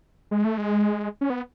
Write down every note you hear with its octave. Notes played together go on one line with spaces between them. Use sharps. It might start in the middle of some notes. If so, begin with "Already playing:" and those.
G#3
A3
G#3
C#4
B3